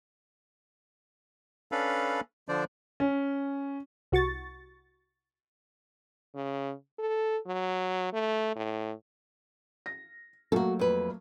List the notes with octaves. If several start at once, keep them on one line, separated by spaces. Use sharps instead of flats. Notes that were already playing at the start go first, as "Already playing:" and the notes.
C#4 D4 A4 B4 F5 B5
D3 F3 D4 C5 D5
C#4
C2 F#4 C#6 A6
C#3
A4
F#3
A3
A2
A#6
F#3 A3 A#3 F#4 A4
F2 B4